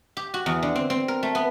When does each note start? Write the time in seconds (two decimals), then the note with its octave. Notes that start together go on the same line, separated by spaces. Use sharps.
0.17 G4
0.34 F#4
0.46 E2
0.63 D3
0.76 C4
0.90 C4
1.08 A#4
1.23 A3
1.35 B3